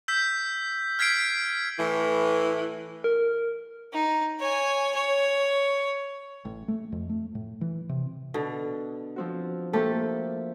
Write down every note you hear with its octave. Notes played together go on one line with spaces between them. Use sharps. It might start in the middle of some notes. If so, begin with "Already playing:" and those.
E6 G6 B6
F6 G#6 B6 C7 D7
A2 E3
A#4
D#4
C#5 G#5
C#5
A1
A3
F2
A3
A2
E3
C3
B2 D3
F3 C4 F#4
A3 A#3 C4 G4 A4